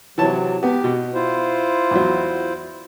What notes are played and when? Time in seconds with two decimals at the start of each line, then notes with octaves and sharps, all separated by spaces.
0.18 C3 E3 F#3 C#5 A5
0.63 B3 G4
0.84 B2
1.14 E4 F4 C5
1.91 E2 F#3